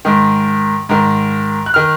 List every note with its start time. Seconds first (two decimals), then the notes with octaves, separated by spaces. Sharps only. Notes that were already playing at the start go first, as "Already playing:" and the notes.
0.05 G#2 D#3
0.89 G#2 D#3
1.66 F#6
1.74 D#3 F6